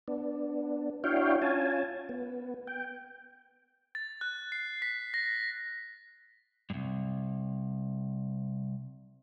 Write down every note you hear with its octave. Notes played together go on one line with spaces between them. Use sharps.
B3 D4
D4 E4 F#4 C#5 F5 G5
C#4 F4 G#5 A5
B3
G5
A6
F#6
C7
B6
A#6
C2 G2